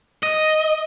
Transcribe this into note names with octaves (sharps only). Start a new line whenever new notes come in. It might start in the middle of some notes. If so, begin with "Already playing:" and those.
D#5